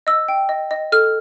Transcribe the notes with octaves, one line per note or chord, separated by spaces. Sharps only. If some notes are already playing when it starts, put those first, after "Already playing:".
D#5 E6
G5
D#5
D#5
A4 F6